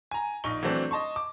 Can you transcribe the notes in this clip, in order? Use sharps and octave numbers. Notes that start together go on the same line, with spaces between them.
G#5 A#5
A#1 D#4 C#6 G7
E3 F#3 A3 C4 D4
D#5 A5 C6 C#6
D6